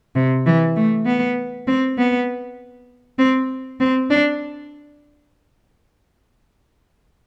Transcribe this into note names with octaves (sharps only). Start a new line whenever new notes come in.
C3
E3
A3
B3
C4
B3
C4
C4
D4